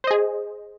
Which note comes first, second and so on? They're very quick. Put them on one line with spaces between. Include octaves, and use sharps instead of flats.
C5 D#5 G#4